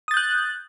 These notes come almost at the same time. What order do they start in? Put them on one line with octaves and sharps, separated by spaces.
D#6 A6 G6 F#6